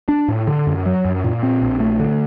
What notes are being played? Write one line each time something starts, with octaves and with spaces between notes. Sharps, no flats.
D4
A2
D3
F#2
F#3
F#2
A#2
C4
A#1
A3
D3